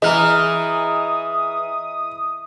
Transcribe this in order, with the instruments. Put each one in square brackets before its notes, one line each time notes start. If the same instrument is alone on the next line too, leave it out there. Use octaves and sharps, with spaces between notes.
[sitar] E3 [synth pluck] G#4 F6 [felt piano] D#5 A#5 [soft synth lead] D#6